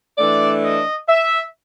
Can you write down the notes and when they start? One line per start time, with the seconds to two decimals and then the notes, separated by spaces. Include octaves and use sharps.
0.18 E3 A3 D4 D5
0.63 D#5
1.08 E5